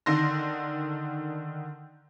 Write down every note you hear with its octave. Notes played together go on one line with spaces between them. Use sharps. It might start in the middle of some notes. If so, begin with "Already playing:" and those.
D3 D#3 C6 A#6